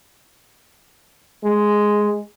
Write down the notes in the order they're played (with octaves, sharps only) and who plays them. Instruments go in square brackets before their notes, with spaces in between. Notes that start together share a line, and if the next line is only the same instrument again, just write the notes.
[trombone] G#3